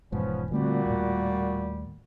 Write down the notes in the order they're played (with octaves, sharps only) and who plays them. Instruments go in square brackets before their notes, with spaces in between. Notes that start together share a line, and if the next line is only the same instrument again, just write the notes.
[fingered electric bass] E1 G#2 [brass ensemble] F3 B3 C#4
[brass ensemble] A#2 F#4 [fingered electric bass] D3 A3 C4 [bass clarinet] G3
[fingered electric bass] D#2 A2